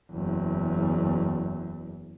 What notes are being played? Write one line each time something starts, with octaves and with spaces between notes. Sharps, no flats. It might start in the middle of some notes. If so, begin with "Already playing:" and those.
F#1 E2